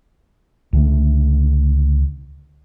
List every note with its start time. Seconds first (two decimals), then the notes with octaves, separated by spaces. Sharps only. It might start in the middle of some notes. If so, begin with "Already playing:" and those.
0.73 C#2 D3 A3